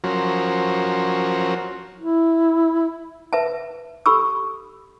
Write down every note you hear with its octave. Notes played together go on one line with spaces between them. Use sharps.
F3 F#3 C#4 F#4 A#4 C5
E4
B4 E5 A5
G4 A4 B5 C#6 E6